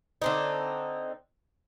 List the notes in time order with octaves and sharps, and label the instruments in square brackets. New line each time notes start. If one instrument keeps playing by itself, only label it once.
[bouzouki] D3 C4 D#4